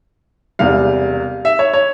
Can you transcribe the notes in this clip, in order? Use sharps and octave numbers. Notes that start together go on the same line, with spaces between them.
E1 E2 C3 G3 F5
E5
C#5
C#5